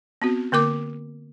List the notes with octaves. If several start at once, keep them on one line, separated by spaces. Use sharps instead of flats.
B3 C4 F#4
D3 A#3 A#4 D6